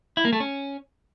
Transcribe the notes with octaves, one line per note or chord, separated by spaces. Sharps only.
E4
A#3
A3
C#4